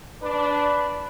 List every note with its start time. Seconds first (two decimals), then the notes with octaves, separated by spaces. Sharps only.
0.23 D4 B4